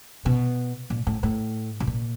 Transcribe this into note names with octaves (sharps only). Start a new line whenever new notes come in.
B2
A#2
A2
A2
B2
A#2